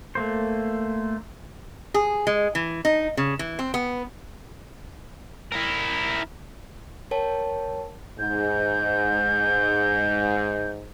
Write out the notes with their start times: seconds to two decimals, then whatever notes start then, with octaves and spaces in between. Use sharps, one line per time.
0.15 A3 A#3 C5
1.94 G#4
2.27 G#3
2.55 E3
2.85 D#4
3.17 C#3
3.39 E3
3.59 C4
3.74 B3
5.52 E4 A#4
7.11 A#4 C#5 G5 A5
8.19 G#2 G6